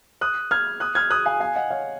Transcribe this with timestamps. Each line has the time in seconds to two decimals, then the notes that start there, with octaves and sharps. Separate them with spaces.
0.21 D#6 F#6
0.51 F6 G#6
0.80 D#6 F#6
0.95 F6 G#6
1.10 D#6 F#6
1.26 F5 G#5
1.40 F5 G#5
1.56 D#5 F#5
1.70 C#5 F5